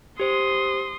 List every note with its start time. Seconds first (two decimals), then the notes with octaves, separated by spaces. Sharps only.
0.20 G4 C5 C6 D#6